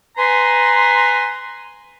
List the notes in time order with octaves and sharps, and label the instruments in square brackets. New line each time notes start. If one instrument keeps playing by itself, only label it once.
[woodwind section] B4 G#5 A#5 C6